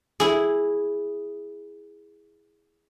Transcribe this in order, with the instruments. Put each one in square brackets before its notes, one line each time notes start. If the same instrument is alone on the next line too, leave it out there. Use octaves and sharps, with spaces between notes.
[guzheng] E4 G#4